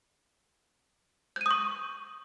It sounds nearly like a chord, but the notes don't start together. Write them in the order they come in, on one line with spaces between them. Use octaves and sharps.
G6 D#7 D#6 C#6